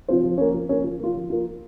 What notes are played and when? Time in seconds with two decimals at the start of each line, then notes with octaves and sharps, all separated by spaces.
0.08 F3 C4 F4 C5
0.23 F3
0.38 A#3 C#4
0.54 F3
0.69 A#3 C#4
0.84 F3
1.00 A#3 F4
1.14 F3
1.30 A#3 F4